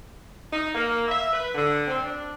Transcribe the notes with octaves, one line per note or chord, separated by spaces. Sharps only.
D#4
A#3
E5
B4
D3
C4
D4